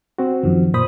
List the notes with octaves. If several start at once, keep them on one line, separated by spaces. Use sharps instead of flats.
C4 F#4
F#2 D#3 F3
A#2 C5 B5 D#6